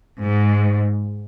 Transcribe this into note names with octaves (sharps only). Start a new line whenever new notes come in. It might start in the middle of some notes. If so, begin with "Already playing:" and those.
G#2